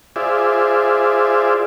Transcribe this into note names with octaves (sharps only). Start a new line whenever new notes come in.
F4 G#4 C5 D5 E5